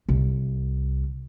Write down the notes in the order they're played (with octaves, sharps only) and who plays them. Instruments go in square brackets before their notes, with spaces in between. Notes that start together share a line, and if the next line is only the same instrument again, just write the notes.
[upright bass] C2